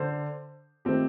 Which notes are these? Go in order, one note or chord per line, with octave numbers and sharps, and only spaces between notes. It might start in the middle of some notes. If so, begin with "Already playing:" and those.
Already playing: D3 C5
D#3 A3 C4 G4